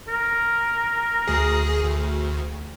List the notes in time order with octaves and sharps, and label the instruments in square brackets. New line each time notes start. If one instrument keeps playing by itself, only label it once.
[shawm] A#4
[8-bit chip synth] D2 G#4
D2